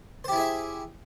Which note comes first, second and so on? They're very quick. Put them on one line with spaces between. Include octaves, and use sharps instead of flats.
C5 G4 E4 G#4 E5